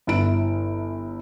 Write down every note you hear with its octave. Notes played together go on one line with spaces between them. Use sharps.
G1 E4 D7